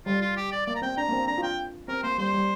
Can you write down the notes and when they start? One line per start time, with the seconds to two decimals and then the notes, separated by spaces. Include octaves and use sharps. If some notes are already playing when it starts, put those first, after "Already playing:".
0.06 G3 F4
0.22 F4
0.37 G4
0.52 D5
0.67 A#3 D5
0.75 A#5
0.82 C4 G5
0.97 D4 A#5
1.09 A#3
1.12 C4
1.27 D4 A#5
1.38 F4
1.43 G5
1.88 C4 A#4
2.03 A#3 C5
2.18 G3 C5
2.34 G3